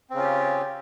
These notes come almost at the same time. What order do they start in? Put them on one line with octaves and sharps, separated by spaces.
C4 C#3 C#4 F4 G4